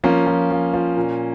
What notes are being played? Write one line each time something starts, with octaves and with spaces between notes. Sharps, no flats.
F3 A#3 C#4
F3
F3
F3
A#2